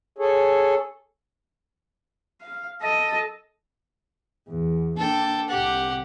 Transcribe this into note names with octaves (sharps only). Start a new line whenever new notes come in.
G#4 A4 C#5
F5
A4 D#5
E2
A#3 D4 A4 G5
C2 C3 G4 F#5